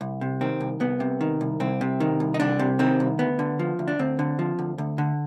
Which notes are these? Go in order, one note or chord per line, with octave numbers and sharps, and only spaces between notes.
C2
C3
D#3 C4
C2
C2 B3
C3
D#3
C2
C2 C4
C3
D#3
C2
D#4
C2 D4
C3
D#3 C4
C2
D2 B3
D3
F3
D2
D4
D2 C4
D3
F3
D2
D2
D3